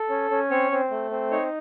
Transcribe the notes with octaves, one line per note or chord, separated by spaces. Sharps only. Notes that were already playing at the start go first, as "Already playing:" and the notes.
Already playing: A4
C#4
C#4
C4 C#5
C4
A3
C4
D#4 C#5